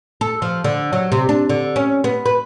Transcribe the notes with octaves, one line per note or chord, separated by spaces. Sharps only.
A4
F3
D3
F#3
C3
D4
D3
C#4
B3
B4